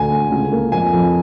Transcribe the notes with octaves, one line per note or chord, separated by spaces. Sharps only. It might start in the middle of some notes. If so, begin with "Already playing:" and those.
Already playing: D2 G#5
A3
C#2
A#3
F2 G#5
F2